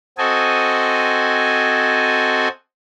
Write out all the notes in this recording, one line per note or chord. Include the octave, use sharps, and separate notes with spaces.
C4 F#4 A4 D#5 G#5